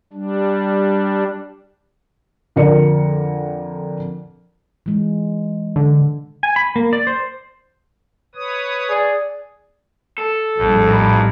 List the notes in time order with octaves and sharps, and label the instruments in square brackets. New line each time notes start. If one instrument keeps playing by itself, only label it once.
[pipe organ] G3 D4
[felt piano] F2 D3 A#4 D5 C#7
[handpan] E3 G#3
[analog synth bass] D3
[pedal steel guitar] G#5
B5
A#3
D5
C5
[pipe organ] B4 C#5 D#6
[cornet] G#4 [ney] D5
[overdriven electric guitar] A4
[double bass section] A#1 A2 G3 [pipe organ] F2
[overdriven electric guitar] D#4 B5